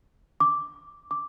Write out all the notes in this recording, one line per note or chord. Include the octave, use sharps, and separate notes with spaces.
D6
D6